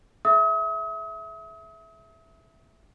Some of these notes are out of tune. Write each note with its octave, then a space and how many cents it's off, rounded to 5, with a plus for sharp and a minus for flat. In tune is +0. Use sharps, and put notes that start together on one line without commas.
G#4 +30 E5 +0 D#6 +40